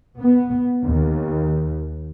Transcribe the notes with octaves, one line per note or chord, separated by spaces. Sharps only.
B3
D#2